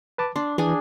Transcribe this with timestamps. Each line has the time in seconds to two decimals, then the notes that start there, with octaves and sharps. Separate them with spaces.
0.18 B4 A5 D6
0.36 D4 C6
0.58 E3 D4 G#4 G#5